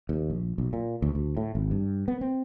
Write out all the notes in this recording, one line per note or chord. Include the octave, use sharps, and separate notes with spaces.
D#2
A#1
B1
A#2
D2
D2
A2
G#1
G2
B3
C4